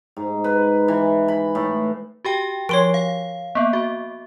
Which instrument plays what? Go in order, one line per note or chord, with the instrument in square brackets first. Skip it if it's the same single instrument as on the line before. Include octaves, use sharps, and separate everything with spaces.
[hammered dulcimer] G#2
B4
E3
B5
A2
[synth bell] F#4 G4 G5
[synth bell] F3 C7 [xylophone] C#5 C6 D7
[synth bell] F5
A#3 B3
F#4